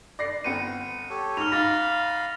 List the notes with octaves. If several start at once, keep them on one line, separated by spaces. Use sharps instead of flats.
D5 A#6 C7
G1 B3 C4 C#7 D#7
G4 A4 C#5
G#2 F6 F7
G#2 F5 B5 A6 A#6